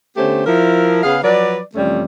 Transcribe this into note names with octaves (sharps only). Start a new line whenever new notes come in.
D3 A3 B3 C#4 G4 C5
F3 E4 A#4
C#3 B3 G#4 F5
F3 F#3 B4 D5
F2 C3 E3 G3 A3 C#4